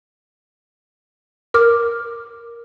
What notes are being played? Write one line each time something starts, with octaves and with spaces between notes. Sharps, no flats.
A#4 D6 F6